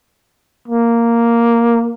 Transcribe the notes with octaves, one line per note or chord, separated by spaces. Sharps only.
A#3